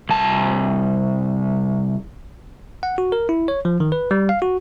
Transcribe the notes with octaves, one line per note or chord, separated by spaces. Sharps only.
C2 A5
F#5
F#4
A#4
E4
C#5
F3
D#3
B4
G3
F5
F#4